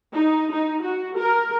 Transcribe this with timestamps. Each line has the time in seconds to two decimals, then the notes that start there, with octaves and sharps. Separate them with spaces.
0.14 D#4
0.50 D#4
0.83 F#4
1.17 A#4